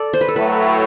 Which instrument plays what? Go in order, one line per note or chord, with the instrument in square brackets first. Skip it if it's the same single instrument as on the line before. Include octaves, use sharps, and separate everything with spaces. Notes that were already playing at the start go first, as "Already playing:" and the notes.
Already playing: [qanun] A4 D5
C5
B4
A4
[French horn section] A2 F#3 A3 [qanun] B4